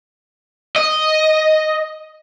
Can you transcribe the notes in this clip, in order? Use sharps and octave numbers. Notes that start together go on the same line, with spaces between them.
D#5